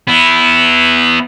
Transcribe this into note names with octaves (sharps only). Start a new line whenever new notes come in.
B3 E4